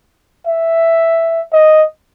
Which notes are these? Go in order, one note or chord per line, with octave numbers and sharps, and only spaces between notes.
E5
D#5